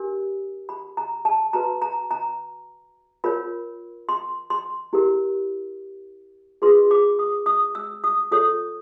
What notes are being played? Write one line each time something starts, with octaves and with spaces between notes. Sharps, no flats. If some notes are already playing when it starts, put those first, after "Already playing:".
Already playing: D4 G4 A#4
B5
A#5
A5
F#4 B4 A#5
A#5
A#5
F4 A#4 C#5 B5
C6
C6
E4 G4 A#4
F4 G#4 B4 C6
D6
D#6
D#6
E6
D#6
F4 A4 C#5 D#6